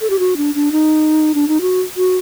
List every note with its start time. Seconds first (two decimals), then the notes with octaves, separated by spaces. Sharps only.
0.01 A4
0.10 G4
0.19 F#4
0.37 D4
0.55 D4
0.72 D#4
1.35 D4
1.48 D#4
1.61 F#4
1.97 F#4